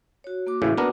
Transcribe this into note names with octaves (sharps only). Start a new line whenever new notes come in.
F#4 C#5
A#3 F#4 D6
A2 C#3 E3
B3 D4 A#4